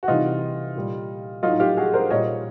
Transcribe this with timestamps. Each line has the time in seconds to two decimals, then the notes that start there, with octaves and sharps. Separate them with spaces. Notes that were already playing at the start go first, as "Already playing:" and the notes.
0.03 F#4
0.08 C3 E3 G3 D#4 F4
0.76 A#2 G3
1.43 A2 F#3 D#4 F4
1.60 F4 G4
1.77 F#4 G#4
1.94 A#4 C5
2.10 A#2 G3 C#5 D#5